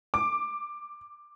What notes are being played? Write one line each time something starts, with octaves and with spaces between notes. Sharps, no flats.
D6